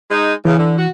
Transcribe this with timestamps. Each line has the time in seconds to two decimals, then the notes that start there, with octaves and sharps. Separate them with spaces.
0.11 G#3 D#4
0.45 E2 C#3 E3
0.58 D3
0.78 F#4